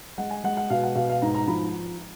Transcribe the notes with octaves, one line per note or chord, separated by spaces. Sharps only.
G#3 F#5
G#5
G#3 F#5
F#5
B2 F5
F#5
B2 F5
F5
G#2 A#5
A#5
F3 B5